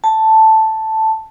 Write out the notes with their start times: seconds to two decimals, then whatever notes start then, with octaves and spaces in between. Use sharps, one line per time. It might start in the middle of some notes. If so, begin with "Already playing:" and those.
0.04 A5